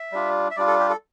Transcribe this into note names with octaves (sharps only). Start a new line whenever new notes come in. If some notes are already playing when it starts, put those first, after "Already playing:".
Already playing: E5
G3 D4 F4
E5
G3 D4 F4 D5
A4
G4
A4